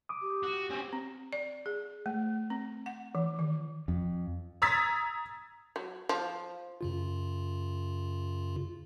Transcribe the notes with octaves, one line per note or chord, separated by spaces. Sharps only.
D6 D#6
G4
F#4
C4 C#4
C4
D5
G#4
A3
C4
F#5
E3
D#3
F2
A#5 D#6 E6 G#6 A6 B6
F#3
F3
F#2 C#3 F4